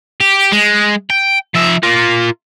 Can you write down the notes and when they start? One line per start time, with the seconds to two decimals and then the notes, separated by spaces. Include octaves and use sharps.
0.21 G4
0.52 G#3
1.10 G5
1.55 F3 E5
1.83 F4 A#4